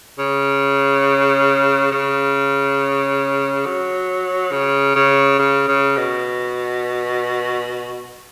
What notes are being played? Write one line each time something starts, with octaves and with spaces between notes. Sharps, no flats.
C#3
C#3
F#3
C#3
C#3
C#3
C#3
B2